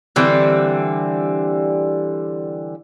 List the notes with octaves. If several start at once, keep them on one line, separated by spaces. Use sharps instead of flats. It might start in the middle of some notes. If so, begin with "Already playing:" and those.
D3 E3 G3 C4